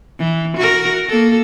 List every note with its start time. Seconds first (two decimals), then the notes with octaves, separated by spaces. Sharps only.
0.19 E3
0.57 F#4 A#4
1.09 A#3 A4